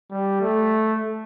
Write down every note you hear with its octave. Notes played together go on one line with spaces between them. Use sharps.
G3
A3